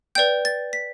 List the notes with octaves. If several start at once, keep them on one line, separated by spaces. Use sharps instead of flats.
B4 D5 G5 G6
A6
B6